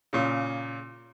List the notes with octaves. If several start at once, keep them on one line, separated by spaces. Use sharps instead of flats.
A#2 C#3